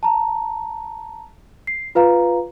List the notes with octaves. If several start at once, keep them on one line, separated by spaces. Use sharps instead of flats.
A5 A#5
C7
F4 B4 F5 A#5